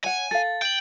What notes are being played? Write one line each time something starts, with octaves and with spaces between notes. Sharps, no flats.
C#5 F#5 G#5
A4 F5 A6
G5 G6 D7 F#7